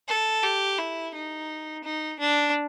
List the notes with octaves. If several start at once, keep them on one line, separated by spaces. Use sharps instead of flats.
A4
G4
E4
D#4
D#4
D4